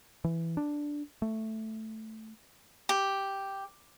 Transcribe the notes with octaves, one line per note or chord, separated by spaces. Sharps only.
E3
D4
A3
G4